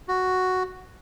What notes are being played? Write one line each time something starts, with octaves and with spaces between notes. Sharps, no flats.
F#4